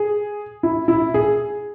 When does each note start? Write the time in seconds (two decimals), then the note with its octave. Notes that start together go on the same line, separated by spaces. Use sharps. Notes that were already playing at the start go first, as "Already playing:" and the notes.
Already playing: G#4
0.63 E4
0.88 E4
1.14 G#4